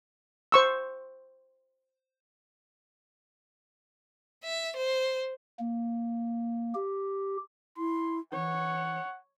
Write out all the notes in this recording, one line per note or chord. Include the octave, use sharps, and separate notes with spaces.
C5 C#6 E6
E5
C5
A#3
G4
E4 C6
E3 C#5 F#5